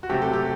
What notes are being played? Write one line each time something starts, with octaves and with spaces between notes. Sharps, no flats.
F#4
C3 F#3 A3 G4
A4
G4